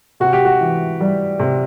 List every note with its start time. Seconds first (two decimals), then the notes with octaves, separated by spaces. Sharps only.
0.20 C3 F#4
0.33 G4
0.45 F#4
0.61 E3
1.00 G3
1.39 C3